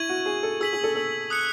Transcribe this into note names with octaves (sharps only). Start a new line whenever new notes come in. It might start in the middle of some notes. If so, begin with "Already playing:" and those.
Already playing: E4 C#6 G#6 D#7 F#7
F#4
G#4
A4
G#4 E6 B6 F#7
G#4
A4
A4
D#6 F#6 C#7